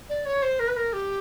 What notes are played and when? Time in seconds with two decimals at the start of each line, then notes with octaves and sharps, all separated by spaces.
0.09 D5
0.25 C#5
0.42 C5
0.59 A#4
0.68 B4
0.76 A#4
0.93 G4